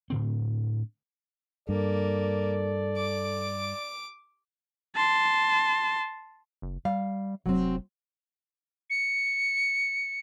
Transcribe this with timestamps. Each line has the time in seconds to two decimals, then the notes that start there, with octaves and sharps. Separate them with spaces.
0.10 A2 D3 C4
1.69 G2 A#3 A4 D5
2.98 D6
4.96 A5 C6
6.62 F#1
6.85 G3 F5
7.46 F1 F#3 C4
8.90 C#7